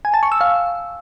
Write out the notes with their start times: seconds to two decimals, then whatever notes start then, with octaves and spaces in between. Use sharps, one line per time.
0.05 G#5
0.14 A5
0.23 C#6
0.32 E6
0.41 F5